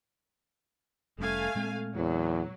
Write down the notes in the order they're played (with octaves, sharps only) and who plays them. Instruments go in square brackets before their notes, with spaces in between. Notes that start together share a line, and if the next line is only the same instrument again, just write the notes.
[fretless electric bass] F1 G3 C#4 [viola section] A3 F5 G#5
[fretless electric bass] A#2 G#3 C4
[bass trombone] E2 [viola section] F#3